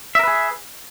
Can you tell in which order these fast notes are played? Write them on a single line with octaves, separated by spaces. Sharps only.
E5 A#4 B4 G#4